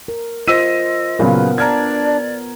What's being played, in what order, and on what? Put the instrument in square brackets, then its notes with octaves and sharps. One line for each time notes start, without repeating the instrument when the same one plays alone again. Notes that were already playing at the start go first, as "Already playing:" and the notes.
[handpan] A#4
[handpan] F4 C5 [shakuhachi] D#5 [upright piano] E6 B6 D#7
[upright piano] A#2 C#3 F#3 [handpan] B3 A#4 [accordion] B4
[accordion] D4 [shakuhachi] D5 [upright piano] A#5 F6 G#6